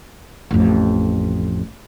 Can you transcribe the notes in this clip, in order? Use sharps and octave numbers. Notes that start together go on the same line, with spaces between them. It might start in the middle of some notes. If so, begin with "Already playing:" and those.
A1 F2